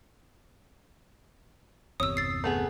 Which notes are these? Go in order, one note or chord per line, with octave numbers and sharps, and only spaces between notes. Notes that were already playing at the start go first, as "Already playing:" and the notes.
G1 E2 C3 C#5 D#6 E6
A6 C7
A3 B3 G#4